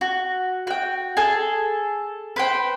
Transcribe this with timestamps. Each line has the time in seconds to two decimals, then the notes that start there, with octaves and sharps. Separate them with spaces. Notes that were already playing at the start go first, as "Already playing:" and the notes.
0.01 F#4
0.67 F#4 G5
1.17 G#4 A4 A5
2.36 B4 C5 G5